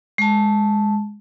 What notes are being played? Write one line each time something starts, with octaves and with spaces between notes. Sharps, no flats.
G#3 A5